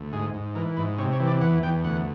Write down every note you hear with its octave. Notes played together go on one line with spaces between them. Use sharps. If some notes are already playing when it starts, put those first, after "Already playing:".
Already playing: D2
G#2 G#4
G#2
E3 A#4
G#2 B4
C3 C#5
C#5
E3
D5
E2 F#5
E2 G5
D2 F#5